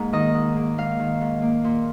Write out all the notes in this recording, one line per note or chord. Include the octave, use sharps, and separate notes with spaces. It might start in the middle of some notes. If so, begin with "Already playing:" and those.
Already playing: G#2 A#3
D#3 D#5
G#2
A#3
G#2 F5
D#3
G#2
A#3
A#2